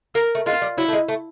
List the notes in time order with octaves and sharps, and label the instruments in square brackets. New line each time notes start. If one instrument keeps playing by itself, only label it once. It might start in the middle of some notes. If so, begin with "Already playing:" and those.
[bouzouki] A#3 [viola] A#4
[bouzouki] A3
[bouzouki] G#3 [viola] F4
[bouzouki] G3
[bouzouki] F#3 [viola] E4
[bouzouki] A3
G#3
A3